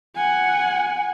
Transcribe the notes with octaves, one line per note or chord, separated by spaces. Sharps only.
F#5 G#5